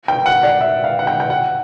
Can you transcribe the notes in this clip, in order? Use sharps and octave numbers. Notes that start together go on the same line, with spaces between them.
G5
F#5
D5
E5
F5
F#5
G5
G5
F#5